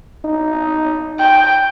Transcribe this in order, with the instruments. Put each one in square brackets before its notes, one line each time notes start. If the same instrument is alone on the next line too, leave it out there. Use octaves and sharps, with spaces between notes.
[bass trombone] D#4
[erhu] G5